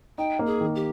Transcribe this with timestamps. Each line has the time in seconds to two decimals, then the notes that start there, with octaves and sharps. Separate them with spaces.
0.18 D#4 G5
0.39 A#3
0.46 G#4
0.61 D#3
0.75 G4